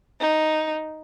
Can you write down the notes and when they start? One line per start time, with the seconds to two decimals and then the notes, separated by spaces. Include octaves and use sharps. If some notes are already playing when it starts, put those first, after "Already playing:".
0.20 D#4